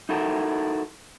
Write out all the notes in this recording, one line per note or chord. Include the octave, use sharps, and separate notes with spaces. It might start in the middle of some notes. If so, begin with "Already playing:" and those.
D#4 E4 F#4 A4 A#4